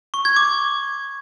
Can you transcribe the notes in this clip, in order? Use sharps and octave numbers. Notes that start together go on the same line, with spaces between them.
C#6
G#6
D6